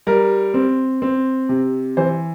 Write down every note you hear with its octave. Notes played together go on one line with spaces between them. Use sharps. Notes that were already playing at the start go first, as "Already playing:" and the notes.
G3 A#4
C4
C4
C3
E3 C5